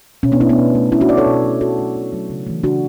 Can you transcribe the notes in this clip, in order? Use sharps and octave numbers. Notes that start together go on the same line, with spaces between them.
B2 C#4
B3 D4
A3 C#4 E4
B3 D4
B2
A3
B2 C#4 E4
D4 F#4
A3 B4 D5
A4 C#5
B2
A3
B2 F#4 A4
F#3 A3
B2
F#3 A3
C#3
E3 A3
C#3 D4 F#4